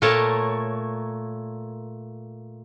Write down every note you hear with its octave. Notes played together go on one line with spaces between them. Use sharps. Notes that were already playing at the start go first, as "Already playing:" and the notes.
A#2 A3 A#4 C#5 A5